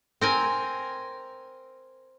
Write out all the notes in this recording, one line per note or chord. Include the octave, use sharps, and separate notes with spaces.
C4 A#4 G#5